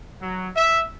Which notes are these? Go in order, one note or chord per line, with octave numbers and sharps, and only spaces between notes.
F#3
E5